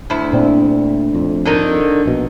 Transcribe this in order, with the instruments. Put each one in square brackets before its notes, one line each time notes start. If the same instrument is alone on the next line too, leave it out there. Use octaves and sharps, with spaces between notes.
[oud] D2 E4
[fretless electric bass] A#2 C4 D4
F2
[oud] D3 D#3 D#4
[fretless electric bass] A#1 B2